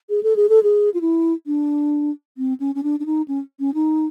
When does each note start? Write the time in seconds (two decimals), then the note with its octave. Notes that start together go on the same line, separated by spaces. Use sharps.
0.10 G#4
0.23 A4
0.36 G#4
0.49 A4
0.63 G#4
0.94 F4
1.01 E4
1.47 D4
2.38 C4
2.60 C#4
2.75 C#4
2.83 D4
3.00 D4
3.06 D#4
3.28 C#4
3.60 C#4
3.74 D#4